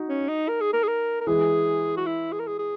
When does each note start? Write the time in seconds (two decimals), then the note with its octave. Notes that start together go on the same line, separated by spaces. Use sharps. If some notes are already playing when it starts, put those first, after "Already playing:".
Already playing: D#4 F#4
0.09 C#4
0.29 D#4
0.49 A#4
0.61 G#4
0.73 A#4
0.83 G#4
0.88 A#4
1.21 A#4
1.27 E3 G#3 G#4
1.97 F#4
2.06 E4
2.32 G#4
2.40 A#4
2.47 G#4
2.59 G#4